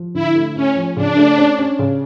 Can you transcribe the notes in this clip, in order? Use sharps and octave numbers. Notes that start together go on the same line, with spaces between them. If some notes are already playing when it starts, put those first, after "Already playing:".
Already playing: F3
D3 E4
A3
A3 C#4
F3
C#3 D4
A3
C#4
C#4
C#3